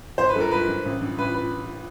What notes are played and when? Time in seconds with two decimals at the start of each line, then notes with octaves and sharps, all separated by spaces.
0.18 G#1 C5
0.29 B4
0.36 G2 A4 A#4
0.51 G#1 B4
0.68 G2
0.86 A1
1.01 G2
1.18 A1 B4
1.34 B4